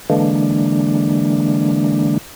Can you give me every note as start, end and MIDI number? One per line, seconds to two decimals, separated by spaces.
0.10 2.18 50
0.10 2.18 52
0.10 2.18 56
0.10 2.18 58
0.10 2.18 62